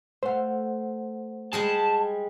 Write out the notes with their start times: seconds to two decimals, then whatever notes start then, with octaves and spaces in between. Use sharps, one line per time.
0.23 A3 C5 F5 F#5
1.53 G3 G#3 G#4 A5